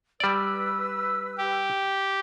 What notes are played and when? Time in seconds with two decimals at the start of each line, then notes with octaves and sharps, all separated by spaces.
0.20 G3 B4 D5 E6
1.38 G4